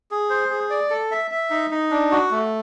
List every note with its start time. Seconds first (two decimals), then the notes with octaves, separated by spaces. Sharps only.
0.11 G#4
0.30 C5
0.50 G#4
0.70 D5
0.90 A4
1.11 E5
1.31 E5
1.50 D#4
1.71 D#4
1.91 D4
2.11 F#4
2.31 A3